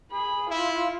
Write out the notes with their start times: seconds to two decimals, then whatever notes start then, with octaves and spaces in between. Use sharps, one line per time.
0.12 G#4 B5
0.50 E4 F4